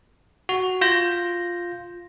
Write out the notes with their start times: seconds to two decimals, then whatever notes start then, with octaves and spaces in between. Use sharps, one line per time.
0.49 F#4
0.81 F4 G6 A#6